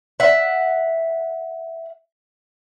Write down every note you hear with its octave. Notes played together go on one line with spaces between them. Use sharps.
E5 F#5